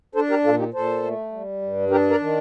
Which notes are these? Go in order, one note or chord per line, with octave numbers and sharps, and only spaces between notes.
D4 A4 C5
G4 A#4
A#2 F4 A4
D#4 G4
A#2 A4 C5
A3
G3
G2
D4 G4 A#4
A#4 D5
D#3